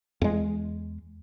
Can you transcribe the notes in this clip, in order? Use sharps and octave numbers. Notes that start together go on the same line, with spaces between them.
E2 G#3